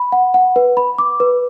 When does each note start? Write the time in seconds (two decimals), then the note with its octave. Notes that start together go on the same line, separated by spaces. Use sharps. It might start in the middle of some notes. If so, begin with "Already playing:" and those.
Already playing: B5
0.12 F#5
0.34 F#5
0.56 B4
0.77 B5
0.98 D6
1.20 B4